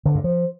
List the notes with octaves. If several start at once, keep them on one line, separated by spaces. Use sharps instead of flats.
D3
G2
F3